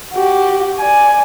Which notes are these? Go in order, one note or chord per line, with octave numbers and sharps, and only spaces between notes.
F#4 G4
D5 G#5